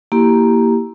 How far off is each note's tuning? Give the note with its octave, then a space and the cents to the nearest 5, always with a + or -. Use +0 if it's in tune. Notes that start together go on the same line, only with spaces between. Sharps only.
A#3 +0 E4 +0 G4 +0